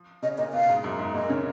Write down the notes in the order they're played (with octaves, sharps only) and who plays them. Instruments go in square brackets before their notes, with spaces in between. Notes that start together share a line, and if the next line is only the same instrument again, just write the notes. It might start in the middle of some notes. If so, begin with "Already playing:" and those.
Already playing: [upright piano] F3
[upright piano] C#3 C#4 [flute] D#5
[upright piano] A#2 A#3 [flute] D#5
[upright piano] B2 B3 [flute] F5
[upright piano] G#2 G#3
F#2 F#3
G#2 G#3
[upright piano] A#2 A#3 [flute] D#5
[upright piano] C#3 C#4